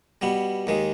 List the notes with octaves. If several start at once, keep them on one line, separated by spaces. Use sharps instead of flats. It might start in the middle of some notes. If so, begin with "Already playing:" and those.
B2 G3 B3
D#2 D#3 G#3